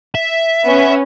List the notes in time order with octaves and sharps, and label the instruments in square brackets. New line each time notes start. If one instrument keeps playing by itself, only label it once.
[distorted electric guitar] E5
[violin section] B3 C#4